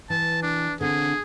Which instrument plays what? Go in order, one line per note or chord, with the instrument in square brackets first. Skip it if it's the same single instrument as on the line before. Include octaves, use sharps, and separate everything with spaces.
[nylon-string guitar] E3 [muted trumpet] A5
[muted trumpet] D4
[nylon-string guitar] D3 C4 [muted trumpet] G#4